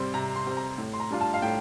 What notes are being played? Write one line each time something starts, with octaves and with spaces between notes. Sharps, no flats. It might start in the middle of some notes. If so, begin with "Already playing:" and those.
Already playing: C3 G3 C4 C6
C3 A#5
C6
G3 C4
A#5
A2
C6
A#5
G3 D4 F4
A5
F5
A2 G5